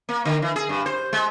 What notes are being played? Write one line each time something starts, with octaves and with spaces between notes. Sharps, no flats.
A#3
D3
E3
G#4
G2
C5
G#3